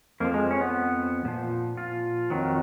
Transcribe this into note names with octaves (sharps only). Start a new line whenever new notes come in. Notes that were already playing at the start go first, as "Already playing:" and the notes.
F2 F3 A#3
G#3
C#4
B3
A#2 F3
F4
F2 D#3 F#3